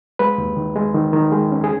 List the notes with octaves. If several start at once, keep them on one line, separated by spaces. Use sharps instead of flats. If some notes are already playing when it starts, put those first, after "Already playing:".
G#3 B4
D#2
D#3
G#3
D#3
D#3
G#3
C#4
G#4